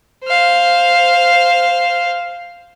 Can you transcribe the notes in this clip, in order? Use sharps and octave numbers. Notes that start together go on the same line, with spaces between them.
C5 F5